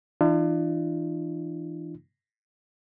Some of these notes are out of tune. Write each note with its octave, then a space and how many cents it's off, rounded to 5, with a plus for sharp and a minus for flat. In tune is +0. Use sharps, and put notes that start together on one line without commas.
E3 +0 D4 +40 F4 -40